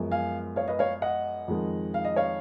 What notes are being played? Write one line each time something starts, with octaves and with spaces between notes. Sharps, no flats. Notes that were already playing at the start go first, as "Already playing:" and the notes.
Already playing: F#2 F3 G#3 B3
F5 G#5
C#5 F5
B4 D#5
C#5 F5
D#5 F#5
F2 D#3 G#3
F5
D#5
C#5 F5